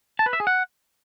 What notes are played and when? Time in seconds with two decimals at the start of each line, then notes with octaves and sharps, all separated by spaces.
0.19 A5
0.26 B4
0.33 E5
0.40 G#4
0.47 F#5